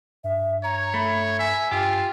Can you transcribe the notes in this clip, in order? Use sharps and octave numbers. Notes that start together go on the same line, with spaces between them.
G2 E5
C#5 A#5
A3 B5
E5 G#5
G2 F4 G4